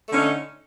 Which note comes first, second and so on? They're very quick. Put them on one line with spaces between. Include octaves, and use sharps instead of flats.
A3 D3 C#4 D#4